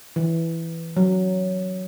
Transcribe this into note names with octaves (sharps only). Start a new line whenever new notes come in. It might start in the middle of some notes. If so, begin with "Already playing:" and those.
E3
F#3